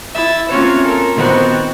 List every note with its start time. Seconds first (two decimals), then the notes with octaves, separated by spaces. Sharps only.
0.15 E4 E5 A6
0.49 A#3 C4 C#4 F4 F#4 C#5
0.84 A4 A#4
1.14 A#2 D#3 B3 C4 F#4